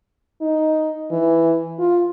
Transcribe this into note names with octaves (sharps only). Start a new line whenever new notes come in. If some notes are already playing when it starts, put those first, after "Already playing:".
D#4
E3
F4